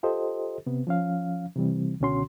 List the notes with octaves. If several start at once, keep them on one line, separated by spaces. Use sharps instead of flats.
F4 G4 A4 C5 D#5
C3 B3
F3 C#4 F5
C3 E3 G3 C4
C#2 B2 D3 C#4 F#4 C6